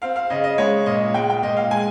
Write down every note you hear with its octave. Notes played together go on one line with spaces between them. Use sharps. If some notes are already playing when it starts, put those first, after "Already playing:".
C4 F5
F5
C#3 D#5
D#5
G#3 C#5
A#2 D#5
G#3 G5
G5
A#2 D#5
F5
G#3 G#5